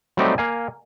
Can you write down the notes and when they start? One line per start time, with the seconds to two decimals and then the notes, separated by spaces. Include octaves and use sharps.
0.17 F#3 G3 A3 C4 D#4 G4
0.38 A#3 F5 G#5